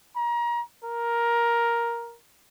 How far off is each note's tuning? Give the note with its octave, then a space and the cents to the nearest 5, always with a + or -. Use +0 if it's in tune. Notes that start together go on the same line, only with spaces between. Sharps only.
A#5 +30
A#4 +10